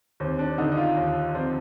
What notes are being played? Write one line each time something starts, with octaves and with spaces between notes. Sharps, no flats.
D#2 C4
D4
D3 D#4
D#4
F4
D#2
F3 C4